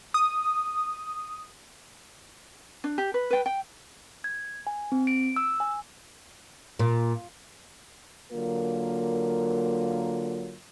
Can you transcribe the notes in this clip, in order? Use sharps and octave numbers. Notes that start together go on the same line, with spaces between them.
D#6
D4
G4
B4
B4 G5
G5
G#6
G#5
C4
D7
E6
G#5
A#2
D3 F#3 A#3 F4 A#4